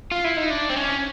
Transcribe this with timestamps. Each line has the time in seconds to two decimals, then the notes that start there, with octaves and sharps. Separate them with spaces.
0.12 F4
0.24 E4
0.37 D#4
0.50 D4
0.70 C4
0.76 C#4